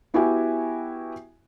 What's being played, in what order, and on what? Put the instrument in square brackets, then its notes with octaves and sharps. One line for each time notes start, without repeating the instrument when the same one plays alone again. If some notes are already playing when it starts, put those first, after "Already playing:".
[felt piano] B3 E4 F#4 G4 E5 G#5